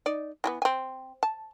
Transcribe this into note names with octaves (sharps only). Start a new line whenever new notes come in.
D#4 D5
E3 G3 B3
C4 G#5
A5